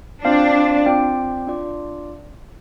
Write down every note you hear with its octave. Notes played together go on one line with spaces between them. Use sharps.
C4 D4 F4 C5 F5 A5
C4 F4 D5 G5
D4 F4 D5